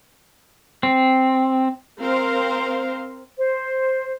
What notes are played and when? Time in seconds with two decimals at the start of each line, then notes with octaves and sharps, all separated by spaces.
0.83 C4
2.01 C4 A#4 C5 F5
3.37 C5